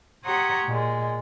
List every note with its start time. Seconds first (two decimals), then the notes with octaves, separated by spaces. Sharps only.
0.24 G4 C#5 F#5 A#5 C6 D#6
0.66 A#2 G#3